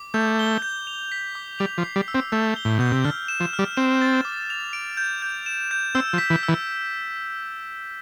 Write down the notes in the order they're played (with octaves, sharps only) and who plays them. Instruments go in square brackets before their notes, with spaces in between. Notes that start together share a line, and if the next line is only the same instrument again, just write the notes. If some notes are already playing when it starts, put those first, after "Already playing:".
Already playing: [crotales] D6
[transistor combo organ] A3 [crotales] G6
[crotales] G7
G6
F7
B6
D6
[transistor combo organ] G3 [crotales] F7
[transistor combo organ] F3
[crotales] C7
[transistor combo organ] G3
[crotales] E6
[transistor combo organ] C4
[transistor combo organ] A3 [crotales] G6
[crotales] G7
[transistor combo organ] A2
[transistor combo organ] B2 [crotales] G6
[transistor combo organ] C3
[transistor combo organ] D3 [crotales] F6
[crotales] E7
[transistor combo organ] F3
[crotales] F6
[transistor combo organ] G3
[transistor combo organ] C4 [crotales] E7
[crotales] A6
D6
F7
D7
G6
G6
E7
G6
[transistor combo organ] C4 [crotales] E6
[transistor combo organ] F3
[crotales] B6
[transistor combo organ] E3
[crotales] E6
[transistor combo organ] E3